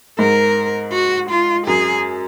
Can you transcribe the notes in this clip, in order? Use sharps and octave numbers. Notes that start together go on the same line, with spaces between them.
G#2 A#4
F#4
F4
F#2 G#4